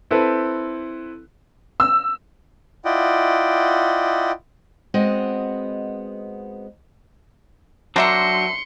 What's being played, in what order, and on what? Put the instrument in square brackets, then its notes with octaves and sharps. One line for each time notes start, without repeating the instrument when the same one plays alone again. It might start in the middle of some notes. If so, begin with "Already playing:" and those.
[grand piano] C4 E4 A4 B4 C5
[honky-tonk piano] E6
[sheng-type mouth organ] E4 F4 D5 D#5 F#5 G5
[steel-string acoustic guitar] G#3 B3 C4 F#4 D#5
[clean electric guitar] F#3 D4 C5 [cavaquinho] A#4 E5 A#5 [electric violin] C6 C#7